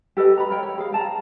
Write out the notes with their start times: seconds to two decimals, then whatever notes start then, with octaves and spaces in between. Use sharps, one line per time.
0.17 G4 A4 B4 D#5
0.38 A#5 B5
0.50 A#4 C#5 G5
0.63 C#5
0.78 G#4 F5
0.92 G5 A5 A#5